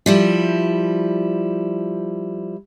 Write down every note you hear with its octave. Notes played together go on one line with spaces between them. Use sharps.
F3 G3 E4